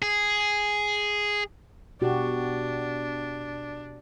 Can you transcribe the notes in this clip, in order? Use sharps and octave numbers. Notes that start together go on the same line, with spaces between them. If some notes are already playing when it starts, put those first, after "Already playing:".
G#4
B2 D4 F#4 G4